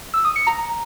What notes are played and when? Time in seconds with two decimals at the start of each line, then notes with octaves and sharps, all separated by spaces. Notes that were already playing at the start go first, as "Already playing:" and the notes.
0.14 E6
0.25 D#6
0.36 C#7
0.47 A#5